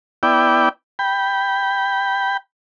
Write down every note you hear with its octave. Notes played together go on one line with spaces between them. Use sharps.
B3 E4 D5 G5
G5 B5